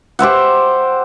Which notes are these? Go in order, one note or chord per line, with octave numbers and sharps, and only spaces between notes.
G4 C5 E5 F#5